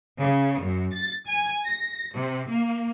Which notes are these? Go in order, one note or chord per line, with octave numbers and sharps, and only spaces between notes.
C#3
F#2
A6
G#5
A#6
C3
A#3